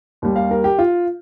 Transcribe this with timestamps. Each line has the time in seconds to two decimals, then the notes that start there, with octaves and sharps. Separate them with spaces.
0.22 D#2 D#3 G3
0.36 F5
0.51 A#4
0.64 G4
0.79 F4